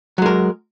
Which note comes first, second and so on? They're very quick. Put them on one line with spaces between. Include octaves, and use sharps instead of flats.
F#3 G#3 A#4